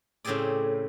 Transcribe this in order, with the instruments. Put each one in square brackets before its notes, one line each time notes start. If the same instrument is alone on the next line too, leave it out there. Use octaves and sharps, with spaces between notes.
[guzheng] A2 C#3 C4 G4 G#4 D5